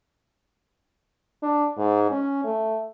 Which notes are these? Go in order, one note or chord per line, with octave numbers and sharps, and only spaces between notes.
D4
G#2
C#4
A3